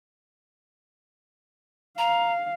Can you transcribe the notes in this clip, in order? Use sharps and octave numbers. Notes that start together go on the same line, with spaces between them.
F5 A#5